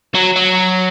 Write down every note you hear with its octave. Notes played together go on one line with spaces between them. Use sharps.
F#3
F#3